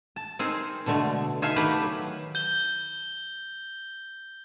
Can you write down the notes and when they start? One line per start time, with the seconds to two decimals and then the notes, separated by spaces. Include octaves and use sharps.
0.16 A5
0.39 C4 D#4 G#4 A#4 C5
0.86 B2 D3 G#3 A3
1.42 D#4 G#4 A4 E5 F5
1.56 D#3 A3 B3 G4 B4 A#5
1.82 F#3
2.35 G6 G7